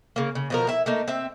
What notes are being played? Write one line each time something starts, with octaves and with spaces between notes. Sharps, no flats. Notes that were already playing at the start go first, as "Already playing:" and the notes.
C#3 A#3
C#3
B2 F3 A#4
E4 E5
A3 A#3 D#4
C4 E5